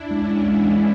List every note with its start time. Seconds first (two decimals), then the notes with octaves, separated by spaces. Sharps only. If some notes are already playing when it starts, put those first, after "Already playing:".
Already playing: D4 E4
0.11 G#3 C#4
0.30 G#3
0.48 E3 G#3
0.68 G#3